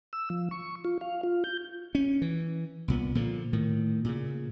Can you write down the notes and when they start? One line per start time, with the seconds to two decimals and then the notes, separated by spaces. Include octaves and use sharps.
0.13 E6
0.30 F3
0.51 C#6
0.85 F4
1.01 F5
1.23 F4
1.44 G6
1.95 C#4
2.22 E3
2.88 C2 A#2 B3
3.15 A#2 D3 F3
3.53 A2 D#3
4.05 A#2 C#3